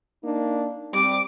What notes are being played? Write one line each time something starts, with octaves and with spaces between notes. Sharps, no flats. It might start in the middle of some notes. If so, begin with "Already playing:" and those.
A#3 D4 D#4
G3 C4 D6